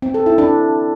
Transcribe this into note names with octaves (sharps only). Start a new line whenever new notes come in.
C4
A4
E4
D4